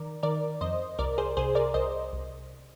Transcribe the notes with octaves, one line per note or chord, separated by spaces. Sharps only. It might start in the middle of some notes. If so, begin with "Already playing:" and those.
Already playing: D#3 A#4 D5
D#3 A#4 D5
F2 C5 D#5
C2 A#4 D5
G#4 C5
C2 G#4 C5
A#4 D5
C2 C5 D#5
C2